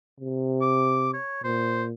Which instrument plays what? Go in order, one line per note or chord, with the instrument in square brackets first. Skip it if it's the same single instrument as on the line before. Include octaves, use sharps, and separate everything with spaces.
[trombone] C3
[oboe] D6
C#5
[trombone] A#2 [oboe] C5